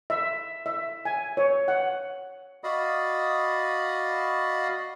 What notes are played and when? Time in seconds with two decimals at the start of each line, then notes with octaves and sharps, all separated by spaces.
0.10 E5
0.66 E5
1.05 G#5
1.37 C#5
1.68 F#5
2.64 F#4 D5 D#5 F5 B5 D#6